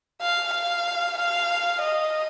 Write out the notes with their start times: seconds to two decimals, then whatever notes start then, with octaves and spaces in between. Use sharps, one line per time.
0.21 F5
0.53 F5
1.18 F5
1.82 D#5